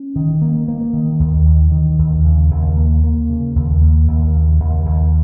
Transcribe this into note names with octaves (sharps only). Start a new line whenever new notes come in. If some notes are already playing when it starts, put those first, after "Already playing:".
Already playing: C#4
D#3
A#3
A#3
D#3
D#2
D#3
D#3
D#2
C#3
D#2
A#3
A#3
C#3
D#2
A#3
D#2
C#3
D#2
D#2